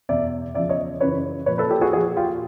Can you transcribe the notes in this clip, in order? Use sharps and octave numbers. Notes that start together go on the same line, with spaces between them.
E2 B2 D5 E5
E2 C#3 F3 D5 E5
C#5 D#5
F#2 C#3 E3 B4 C#5
A#2 F3 B4 C#5
A4 B4
G4 A4
F#4 G#4
A#2 F3 F#4 G#4
F4 G4